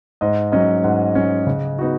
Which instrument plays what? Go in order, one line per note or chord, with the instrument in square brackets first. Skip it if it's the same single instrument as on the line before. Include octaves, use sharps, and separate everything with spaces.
[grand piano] G#2 [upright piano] D#5
[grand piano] F#3 C#4 [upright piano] D#5
[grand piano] G#2 [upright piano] F#5
[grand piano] F#3 C#4
C#3
B3 D#4 F#4